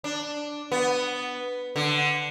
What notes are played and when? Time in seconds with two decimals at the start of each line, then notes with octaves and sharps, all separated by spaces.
0.04 D4
0.72 B3
1.76 D3